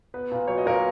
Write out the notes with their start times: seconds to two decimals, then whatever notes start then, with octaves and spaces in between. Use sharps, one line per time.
0.14 B3 B4
0.31 A#2
0.48 F#3 C#5
0.58 D#5
0.66 A#2 A#4 C#5